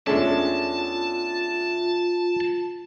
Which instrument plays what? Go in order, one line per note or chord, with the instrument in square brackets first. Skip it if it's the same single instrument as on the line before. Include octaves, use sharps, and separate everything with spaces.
[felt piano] E2 G#3 A3 [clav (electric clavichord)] C#4 D4 [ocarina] F4 [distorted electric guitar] A5